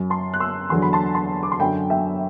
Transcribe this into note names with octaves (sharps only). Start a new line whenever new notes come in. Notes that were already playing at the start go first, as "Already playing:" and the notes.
Already playing: F#2 F#3
A5 C6
F#6
C6 E6
E2 D3 F#3 C6
B5
A5 C6
A5 C6
D6
C6
F#2 D3 F#3 G5 B5
E5 G5